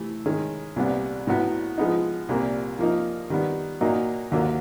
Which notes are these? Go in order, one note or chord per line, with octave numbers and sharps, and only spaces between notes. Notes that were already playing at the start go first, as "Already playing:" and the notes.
Already playing: C3 E3 A3
D#3 G#3 C#4
C2 A#2 G3 B3 D4
A2 F#3 B3 E4
F3 G#3 B3 D#4
C2 A#2 G3 A#3
F3 A#3 D#4
D#3 G3 B3
A#2 F#3 A#3 D#4
D#2 D3 F#3 A#3